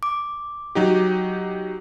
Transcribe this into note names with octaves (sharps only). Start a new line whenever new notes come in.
D6
F#3 D#4 G4